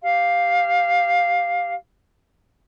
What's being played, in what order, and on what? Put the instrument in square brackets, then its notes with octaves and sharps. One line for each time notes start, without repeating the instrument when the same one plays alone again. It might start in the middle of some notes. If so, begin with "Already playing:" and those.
[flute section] G4 F5